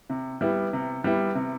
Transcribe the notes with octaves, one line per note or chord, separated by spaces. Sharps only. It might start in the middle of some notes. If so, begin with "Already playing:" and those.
C3
G3 B3 E4
C3
G3 B3 E4
C3